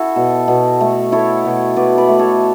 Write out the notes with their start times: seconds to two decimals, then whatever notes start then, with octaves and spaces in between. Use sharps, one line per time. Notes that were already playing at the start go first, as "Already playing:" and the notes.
Already playing: E4 F#4 A4
0.16 B2
0.48 B2
0.81 A3
1.12 E4 A4 C#5
1.45 B2
1.76 B2 B4 D5
1.98 B4 D5
2.08 A3
2.19 A4 C#5